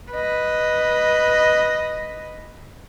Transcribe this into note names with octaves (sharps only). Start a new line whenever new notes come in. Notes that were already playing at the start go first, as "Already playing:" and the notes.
B4 D#5